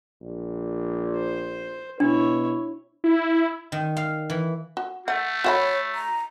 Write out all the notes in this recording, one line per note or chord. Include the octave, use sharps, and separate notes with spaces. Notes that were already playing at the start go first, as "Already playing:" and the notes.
A#1
C5
B2 D4 E4 C#5
E4
D#3
F5
E3
F#4
A3 F#5
F#4 C#5 F#5 B5
A#5